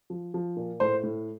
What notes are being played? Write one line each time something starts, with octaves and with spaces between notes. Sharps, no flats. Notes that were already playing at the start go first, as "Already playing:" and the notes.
F3
F3
A#2
A2 C5
A2